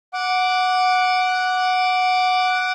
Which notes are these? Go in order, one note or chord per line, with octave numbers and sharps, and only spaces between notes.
F#5 D6